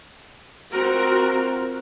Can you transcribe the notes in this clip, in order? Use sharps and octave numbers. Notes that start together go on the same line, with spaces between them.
C4 F4 F#4 A#4